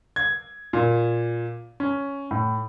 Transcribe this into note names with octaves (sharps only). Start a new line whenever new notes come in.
G#6
A#2
C#4
A2